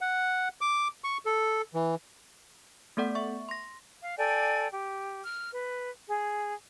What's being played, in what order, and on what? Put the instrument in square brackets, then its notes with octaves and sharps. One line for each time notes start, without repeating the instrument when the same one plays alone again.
[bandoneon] F#5
D6
C#6
A4
E3
[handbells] A3 B3 A4 D5 F#5
E5 C#6
C6 A#6
[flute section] F5
A4 D5 G5 G#5
G4
F6
B4
G#4